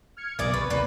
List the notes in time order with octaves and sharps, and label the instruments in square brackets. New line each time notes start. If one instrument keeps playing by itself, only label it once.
[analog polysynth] F6 G#6 C#7
[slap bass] B1 A#2 [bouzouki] G#4 A#4 D5 [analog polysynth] A6
[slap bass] C3 [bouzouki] B4 [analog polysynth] C#6
[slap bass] D#2 [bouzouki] A#3 B4 [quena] D5